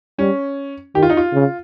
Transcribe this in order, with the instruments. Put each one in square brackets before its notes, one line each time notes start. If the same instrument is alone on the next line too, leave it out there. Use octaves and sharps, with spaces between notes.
[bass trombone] G3 [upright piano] C#4
[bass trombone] D#3 [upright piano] G4
[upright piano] F4
D#4
F4
[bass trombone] C#3